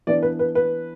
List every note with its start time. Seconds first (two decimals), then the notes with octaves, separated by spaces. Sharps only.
0.07 E3 B3 D4 D5
0.23 B4
0.39 B4
0.55 B4